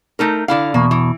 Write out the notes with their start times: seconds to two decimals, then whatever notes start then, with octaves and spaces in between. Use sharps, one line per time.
0.19 A3 D#4 A#4
0.48 D3 E4 F5
0.74 E2 B2 A#3
0.91 E3